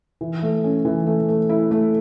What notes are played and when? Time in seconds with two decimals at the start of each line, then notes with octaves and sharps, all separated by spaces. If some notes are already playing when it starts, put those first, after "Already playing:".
0.21 E3
0.42 A3
0.64 C#4
0.85 E3
1.07 A3
1.28 A3
1.49 E4
1.71 A3